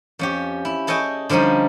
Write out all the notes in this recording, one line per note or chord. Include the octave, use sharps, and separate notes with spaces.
F2 C#4 G4
E4
G#4 A4 C#5 D#5 G5 G#5
D3 F3 G3 C#4 D#4